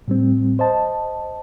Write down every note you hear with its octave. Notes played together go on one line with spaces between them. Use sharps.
A2 G3 C4
C5 D#5 A5